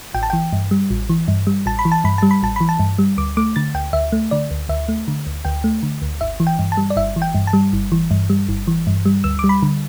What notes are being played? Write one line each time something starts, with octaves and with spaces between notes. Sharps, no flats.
A1 G5
A5
E3 G5
G2
G3
A1
E3
G2
G3
A1 A5
B5
E3
A5
G2 B5
G3 A5
B5
A1 A5
E3 B5
A5
G2
G3
D2 D6
A3 D6
D3 A6
D2 G5
D2 E5
A3
D3 D5
D2
D2 E5
A3
D3
D2
D2 G5
A3
D3
D2
G1 E5
E3
G5
G2
A5
G3
D5
G1 E5
E3
G5
G2
A5
G3
G1
E3
G2
G3
G1
E3
G2
G3
D2 E6
G3 D6
B5
D3